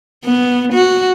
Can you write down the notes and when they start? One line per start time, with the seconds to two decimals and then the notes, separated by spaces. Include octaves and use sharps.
0.25 B3
0.73 F#4